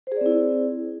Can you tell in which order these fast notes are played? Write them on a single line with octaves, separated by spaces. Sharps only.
C5 G#4 D5 C4 E4